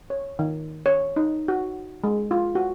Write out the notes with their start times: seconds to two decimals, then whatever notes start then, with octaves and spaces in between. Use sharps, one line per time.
0.10 C#5
0.39 D#3
0.86 C#5
1.16 D#4
1.48 F#4
2.04 G#3
2.31 F4
2.55 F#4